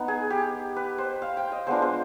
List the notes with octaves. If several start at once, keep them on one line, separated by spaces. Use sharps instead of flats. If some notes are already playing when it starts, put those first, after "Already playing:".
Already playing: B3 D#4
G#4
G4
B4
C5
F5
G5
D#5
G#3 B3 D4 F4 C5
C5